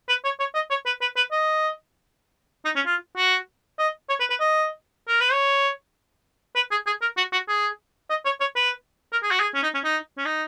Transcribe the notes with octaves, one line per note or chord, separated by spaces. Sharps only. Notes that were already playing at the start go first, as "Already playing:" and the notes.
B4
C#5
C#5
D#5
C#5
B4
B4
B4
D#5
D#4
C#4
F4
F#4
D#5
C#5
B4
B4
D#5
A#4
B4
C#5
B4
G#4
G#4
A#4
F#4
F#4
G#4
D#5
C#5
C#5
B4
A#4
G#4
F#4
G#4
C#4
D#4
C#4
D#4
C#4
D#4